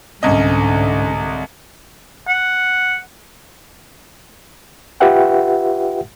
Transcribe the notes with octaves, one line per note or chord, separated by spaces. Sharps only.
C2 G#2 D3 C#4 D#5
F#5
F4 G4 B4 E5 F#5 G5